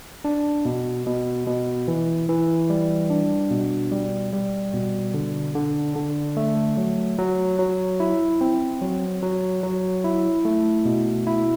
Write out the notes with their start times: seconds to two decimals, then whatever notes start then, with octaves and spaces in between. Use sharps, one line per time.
0.25 D4
0.65 B2
1.06 B2
1.47 B2
1.88 E3
2.29 E3
2.70 G3
3.10 D4
3.51 B2
3.92 G3
4.33 G3
4.73 B2
5.14 D3
5.55 D3
5.96 D3
6.37 A3
6.77 F#3
7.18 F#3
7.59 F#3
8.00 E4
8.41 C4
8.81 F#3
9.23 F#3
9.63 F#3
10.04 E4
10.45 A3
10.85 B2
11.27 E4